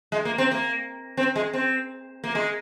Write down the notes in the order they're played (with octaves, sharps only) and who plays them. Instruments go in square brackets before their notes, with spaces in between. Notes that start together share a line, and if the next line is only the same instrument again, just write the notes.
[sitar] G#3
A#3
C4
A#3
C4
G#3
C4
A#3
G#3